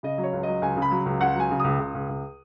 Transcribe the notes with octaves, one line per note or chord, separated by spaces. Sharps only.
C#3 D#5
F#3
C#5
C#2
F#3 D#5
C#2 G#5
C#3
B5
F#3
C#2
C#2 F#5
F#3 G#5
C#3
C#2 D#6
C#2
C#2
C#2